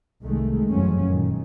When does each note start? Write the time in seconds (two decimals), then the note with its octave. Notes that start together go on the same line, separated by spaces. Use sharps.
0.23 C2 D#3 G#3 A3
0.70 F#1 E2 G2 F3 F#3 C#4
1.06 F#2 A#2 D#3